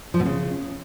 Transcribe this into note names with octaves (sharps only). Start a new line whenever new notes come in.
F3
B2
C#3